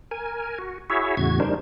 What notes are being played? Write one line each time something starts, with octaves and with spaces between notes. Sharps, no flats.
A#4 G#5
F#4
E4 F#4 G#4 C#5 E5
E2 A2 C#3 F#4 G#6
G3 D4 D#4 A#4 C5